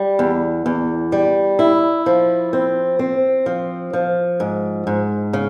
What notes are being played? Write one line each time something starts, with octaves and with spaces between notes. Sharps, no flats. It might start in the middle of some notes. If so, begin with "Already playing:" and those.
Already playing: G3
E2
E2
G3
E4
F3
C4
C4
F3
F3
G#2
G#2
C#3